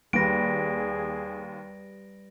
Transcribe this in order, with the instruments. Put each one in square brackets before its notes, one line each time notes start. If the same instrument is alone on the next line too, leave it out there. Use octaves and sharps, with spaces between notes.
[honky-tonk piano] D#2 [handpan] G3 B4 [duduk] G#4 [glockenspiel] A#6 D7